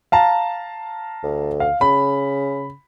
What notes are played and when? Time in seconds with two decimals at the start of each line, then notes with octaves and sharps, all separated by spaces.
0.12 F5 A5 A#5
1.23 D2
1.60 F5
1.81 C#3 B5